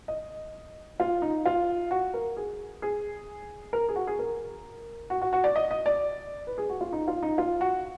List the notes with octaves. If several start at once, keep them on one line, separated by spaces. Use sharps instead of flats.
D#5
F4
D#4
F4
F#4
A#4
G#4
G#4
A#4
G#4
F#4
G#4
A#4
F#4
F#4
F#4
D5
D#5
D#5
D5
B4
G#4
F#4
F4
D#4
F4
D#4
F4
F#4